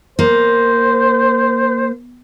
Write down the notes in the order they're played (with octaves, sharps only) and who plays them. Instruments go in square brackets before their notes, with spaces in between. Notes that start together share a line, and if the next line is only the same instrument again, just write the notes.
[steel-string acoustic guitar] A#3 [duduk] C5